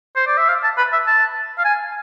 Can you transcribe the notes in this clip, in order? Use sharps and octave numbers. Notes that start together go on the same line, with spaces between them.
C5
D5
E5
F5
A5
B4
E5
A5
F5
G#5